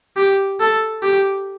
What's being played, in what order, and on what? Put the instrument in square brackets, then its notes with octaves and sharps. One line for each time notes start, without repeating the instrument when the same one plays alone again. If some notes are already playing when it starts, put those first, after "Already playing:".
[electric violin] G4
A4
G4